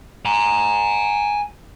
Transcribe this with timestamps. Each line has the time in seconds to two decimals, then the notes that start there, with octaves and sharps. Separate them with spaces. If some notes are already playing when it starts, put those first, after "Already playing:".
0.25 G#5 A#5